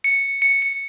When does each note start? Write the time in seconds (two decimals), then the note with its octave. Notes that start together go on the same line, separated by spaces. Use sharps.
0.04 C#7
0.42 C#7
0.62 C#7